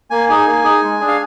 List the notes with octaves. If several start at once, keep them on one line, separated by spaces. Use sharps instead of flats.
A#3 G#5
D#4 G#4 G#5
A#3
D#4 G#4
G#3
D4 G#4
F5